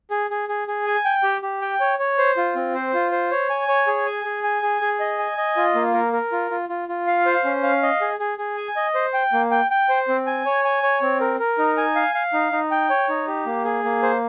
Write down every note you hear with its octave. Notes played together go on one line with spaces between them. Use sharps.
G#4
G#4
G#4
G#4
G#5
G5
G4
G4
G5
C#5
C#5
C5
F4
C4
C5
F4
C5
C#5
G#5
C#5
G#4
G#5
G#4
G#5
G#4
G#4
D#5
G#5
D#5
F4
A#3
A#4
A#4
F4
F4
F4
F4
F5
C5
C#4
F5
D#5
G#4
G#4
G#4
G#5
D#5
C5
G5
A#3
G5
G5
C5
C4
G#5
C#5
G#5
C#5
C4
A#4
A#4
D#4
G#5
F5
F5
D#4
D#4
G5
C#5
D#4
G4
A#3
G#4
A#3
C5